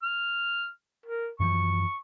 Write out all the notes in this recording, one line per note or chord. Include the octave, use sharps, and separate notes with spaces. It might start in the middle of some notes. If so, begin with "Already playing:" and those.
F6
A#4
F#2 E3 F3 C#6